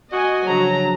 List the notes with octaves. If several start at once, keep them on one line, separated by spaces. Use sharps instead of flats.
F#4 D#5 G#5
C#3 F3 F#3 D4 A#5